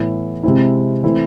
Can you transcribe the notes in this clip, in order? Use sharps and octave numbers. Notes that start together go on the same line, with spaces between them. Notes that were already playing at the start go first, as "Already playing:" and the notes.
Already playing: A2 E3 B3 E4
C3 G#3 C4 E4
E3 A3 C4 E4